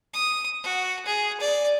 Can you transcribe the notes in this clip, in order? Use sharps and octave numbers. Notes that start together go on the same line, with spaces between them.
D#6
F#4
G#4
D5